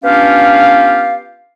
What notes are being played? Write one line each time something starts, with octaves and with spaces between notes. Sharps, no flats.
B3 C#4 D4 F4 G4 F5